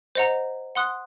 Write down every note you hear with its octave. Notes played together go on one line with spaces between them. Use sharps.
C5 D#5 F#5 A#5
F#5 C6 D#6 F#6